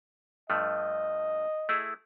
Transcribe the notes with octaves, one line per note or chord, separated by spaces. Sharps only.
G2 F3 A3 D#5
A3 E4 G#4